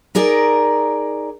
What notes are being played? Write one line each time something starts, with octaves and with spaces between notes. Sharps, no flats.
D#4 G#4 A#4 D5